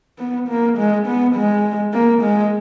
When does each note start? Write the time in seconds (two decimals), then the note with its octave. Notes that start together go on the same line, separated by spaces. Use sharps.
0.19 B3
0.48 A#3
0.77 G#3
1.07 B3
1.35 G#3
1.93 A#3
2.22 G#3